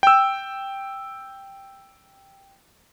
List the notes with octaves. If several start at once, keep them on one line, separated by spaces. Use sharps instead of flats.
G5 E6